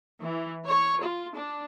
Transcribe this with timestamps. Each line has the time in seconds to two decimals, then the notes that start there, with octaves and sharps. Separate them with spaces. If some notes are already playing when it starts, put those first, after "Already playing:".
0.22 E3
0.66 C#5
1.00 F4
1.34 D4